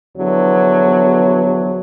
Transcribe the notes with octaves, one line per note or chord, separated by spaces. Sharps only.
E2 D3 F3 F#3 B3